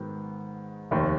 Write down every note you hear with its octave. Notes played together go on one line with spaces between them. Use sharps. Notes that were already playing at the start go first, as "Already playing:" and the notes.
Already playing: G#2 D#3 F#3 B3
F1 D#2 D#3